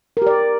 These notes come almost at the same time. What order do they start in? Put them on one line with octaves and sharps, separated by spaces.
A#4 G4 D5